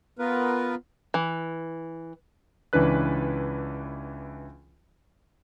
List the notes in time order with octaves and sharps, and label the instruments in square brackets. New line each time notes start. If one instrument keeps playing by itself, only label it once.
[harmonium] B3 F4 A#4 B4
[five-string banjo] E3
[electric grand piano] C#2 E3 C#4 D4 B4 F#6